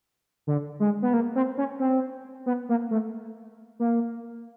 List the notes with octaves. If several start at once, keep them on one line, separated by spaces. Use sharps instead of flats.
D3
G#3
B3
A#3
C4
C#4
C4
B3
A#3
A3
A#3